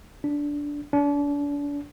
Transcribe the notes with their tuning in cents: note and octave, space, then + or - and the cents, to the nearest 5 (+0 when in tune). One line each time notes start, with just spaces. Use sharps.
D4 -10
D4 -35